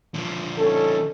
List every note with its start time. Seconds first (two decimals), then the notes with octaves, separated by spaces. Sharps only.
0.14 D3 F3
0.58 C#4 D#4 A4